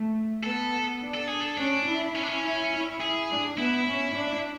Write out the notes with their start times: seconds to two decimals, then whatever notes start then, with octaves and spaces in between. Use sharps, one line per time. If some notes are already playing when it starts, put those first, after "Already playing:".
Already playing: A3
0.43 B3 A4
1.01 D4
1.14 A4
1.27 G#4
1.41 A4
1.58 C#4 D4
1.86 E4
2.15 C#4
2.23 D4
2.29 C#4
2.44 E4
2.72 E4
3.01 G#4
3.29 D4
3.57 B3 E4
3.87 C#4
4.15 D4